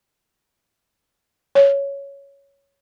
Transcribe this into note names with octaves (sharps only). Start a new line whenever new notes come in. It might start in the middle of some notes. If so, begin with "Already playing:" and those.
C#5